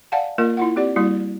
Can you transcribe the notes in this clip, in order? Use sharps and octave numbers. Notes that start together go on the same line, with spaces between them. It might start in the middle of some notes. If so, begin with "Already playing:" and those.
D5 F5 F#5 G#5 A5
A#3 F4 A#4 D#5
E4 F4 F#5
C4 G4 D5
G3 A#3 E4 F#4